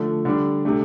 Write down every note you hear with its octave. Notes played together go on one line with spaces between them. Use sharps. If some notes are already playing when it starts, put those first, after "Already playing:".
Already playing: D3 F3 A3
D3 G3 D4
C3 A3 D4